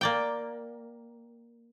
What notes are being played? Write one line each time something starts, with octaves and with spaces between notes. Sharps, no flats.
A#3 D5 G5